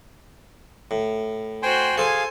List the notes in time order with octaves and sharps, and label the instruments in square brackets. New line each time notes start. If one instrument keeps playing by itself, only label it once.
[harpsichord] A2
[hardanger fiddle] F#4 C5 [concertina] G5 G#5 C6
[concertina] G#4 F5 [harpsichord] A4 C5 [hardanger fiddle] G#5